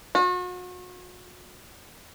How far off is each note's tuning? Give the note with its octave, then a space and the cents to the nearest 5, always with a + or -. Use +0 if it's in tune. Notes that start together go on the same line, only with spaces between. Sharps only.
F#4 -40